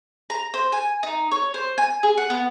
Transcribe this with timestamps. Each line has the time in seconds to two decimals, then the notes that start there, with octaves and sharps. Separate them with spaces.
0.30 A#5
0.54 C5
0.72 G#5
1.03 D#4
1.31 C#5
1.54 C5
1.78 G#5
2.03 G#4
2.18 F#5
2.30 B3